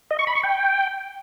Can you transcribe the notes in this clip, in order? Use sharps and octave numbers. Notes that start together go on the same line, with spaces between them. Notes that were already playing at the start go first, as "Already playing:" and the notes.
D#5
C#6
B5
C#6
G5